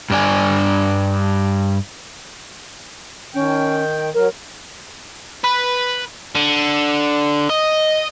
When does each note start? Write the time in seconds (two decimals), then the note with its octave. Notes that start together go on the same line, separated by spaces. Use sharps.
0.10 G2 D4 G#5
3.34 D#3 C#4 G5
4.14 F#3 A#4
5.44 B4
6.35 D3
7.50 D#5